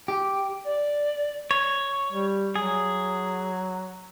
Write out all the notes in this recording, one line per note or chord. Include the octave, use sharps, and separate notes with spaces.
G4
D5
C#5
G3
F#3 G#4